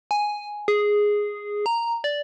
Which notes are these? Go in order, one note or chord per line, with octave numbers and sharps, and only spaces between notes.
G#5
G#4
A#5
D5